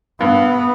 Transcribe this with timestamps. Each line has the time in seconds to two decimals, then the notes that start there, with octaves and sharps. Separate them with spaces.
0.20 G2 B3